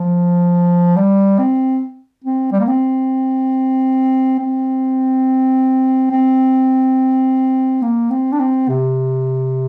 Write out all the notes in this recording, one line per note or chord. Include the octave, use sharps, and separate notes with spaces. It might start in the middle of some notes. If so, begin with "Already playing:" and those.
Already playing: F3
G3
C4
C4
G3
A#3
C4
C4
C4
A#3
C4
D4
C4
C3